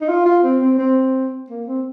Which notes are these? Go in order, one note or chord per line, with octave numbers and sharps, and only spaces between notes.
D#4
F4
F4
C4
C4
C4
A#3
C4